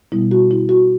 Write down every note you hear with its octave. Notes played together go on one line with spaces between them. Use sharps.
B2 G3 B3 E4
F#4
E4
F#4